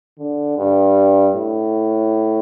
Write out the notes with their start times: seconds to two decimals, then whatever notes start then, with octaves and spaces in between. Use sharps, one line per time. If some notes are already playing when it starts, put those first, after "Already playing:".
0.19 D3
0.58 G2
1.35 A2